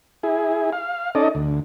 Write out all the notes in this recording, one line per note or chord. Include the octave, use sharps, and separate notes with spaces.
E4 G#4
F5
C#4 D#4 A4 D5 D#5
D2